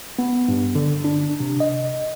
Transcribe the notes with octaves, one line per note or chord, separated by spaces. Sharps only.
B3
G2
D3
D4
C3
D#5